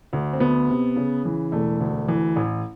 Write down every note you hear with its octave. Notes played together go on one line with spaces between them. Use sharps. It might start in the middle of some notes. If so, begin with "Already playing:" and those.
D2
C4
D2 B3
C3
C#3
E3
E1 A3
D2
E3
A1